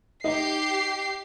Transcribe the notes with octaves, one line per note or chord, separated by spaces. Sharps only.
D#4 G4 C7